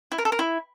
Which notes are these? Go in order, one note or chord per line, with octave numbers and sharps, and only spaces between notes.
E4
A#4
A4
A#4
E4